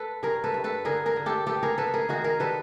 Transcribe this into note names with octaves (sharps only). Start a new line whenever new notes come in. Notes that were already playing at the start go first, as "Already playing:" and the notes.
Already playing: A4 B4
G2 G#4 A#4
A4 B4
G2
A4 B4
D3 G#4 A#4
G#4 A#4
D3
G4 A4
B3 G4 A4
G#4 A#4
B3 A4 B4
G#4 A#4
D#3 F#4 G#4
G#4 A#4
G3 A4 B4